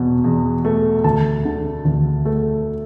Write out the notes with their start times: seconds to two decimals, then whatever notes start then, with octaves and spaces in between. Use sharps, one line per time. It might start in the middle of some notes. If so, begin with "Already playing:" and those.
Already playing: E2 B2
0.24 E2
0.65 A3
1.04 D2 A5
1.45 D3
1.85 D2
2.25 A3